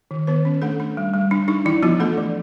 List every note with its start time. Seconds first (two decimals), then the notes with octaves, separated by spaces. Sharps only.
0.11 D#3
0.27 D#3 B3 B4
0.45 C#4
0.62 A3 D4 A4
0.80 D4
0.97 G3
1.13 G3
1.31 D4
1.48 D4 D#4
1.66 E3 D4 E4
1.82 F3 B3 F4
2.00 A3 D4 A4
2.18 E3